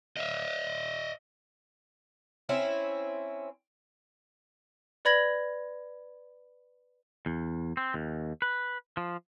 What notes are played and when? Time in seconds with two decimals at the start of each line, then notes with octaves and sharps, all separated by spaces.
0.17 D#5 E5
2.49 C4 C#4 E4
5.05 B4 D5 B5 G#6 A#6 F#7
7.26 E2
7.77 C4
7.94 D#2
8.42 B4
8.97 F3